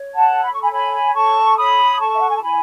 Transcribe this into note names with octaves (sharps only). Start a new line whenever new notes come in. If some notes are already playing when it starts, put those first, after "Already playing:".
Already playing: C#5
F#5 A5
A4
B5
C#6
G#5 B5
C#5 G#5 B5
A4 A5 C#6
C#5 B5 D#6
A4 A5 C#6
E5
F#5
G#5
A5
E4 G#5 B5